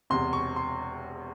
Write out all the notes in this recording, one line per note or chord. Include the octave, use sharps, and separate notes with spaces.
E1 E2 C3 C6
C#6
C6